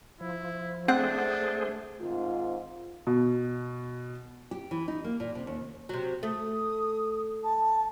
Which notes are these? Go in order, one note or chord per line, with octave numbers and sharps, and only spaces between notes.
F3 E4
A3 C4 D4 G#4 C5 F#5
G#2 D#3 C4 F4
B2
G4
E3
D#4
A#3
A#2
C3
D#2
C3 F#3
A3 D#6
A5